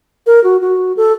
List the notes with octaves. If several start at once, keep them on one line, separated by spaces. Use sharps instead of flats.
A#4
F#4
F#4
A4